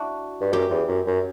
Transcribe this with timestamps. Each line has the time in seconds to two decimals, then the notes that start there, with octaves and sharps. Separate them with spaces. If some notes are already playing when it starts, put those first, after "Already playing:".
Already playing: D4 E4 F#4
0.41 G2
0.52 F#2 G4
0.70 E2
0.88 F#2
1.07 F#2